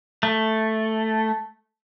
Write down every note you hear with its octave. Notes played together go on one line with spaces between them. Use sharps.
A3